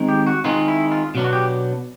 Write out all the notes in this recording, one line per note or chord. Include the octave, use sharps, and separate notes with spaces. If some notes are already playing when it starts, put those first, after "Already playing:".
Already playing: D#3 G#3 C4 D#4
G4
F#4
D#3 G#3 C4 D#4 F4
E4
F4
B2 F#3 B3 D4
F#4
G4